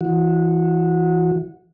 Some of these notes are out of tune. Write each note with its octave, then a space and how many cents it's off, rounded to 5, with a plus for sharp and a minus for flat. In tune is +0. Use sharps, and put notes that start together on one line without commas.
E3 +10 F#4 -20